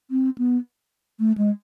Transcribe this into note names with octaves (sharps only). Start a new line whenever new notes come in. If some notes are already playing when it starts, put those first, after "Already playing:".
C4
B3
A3
G#3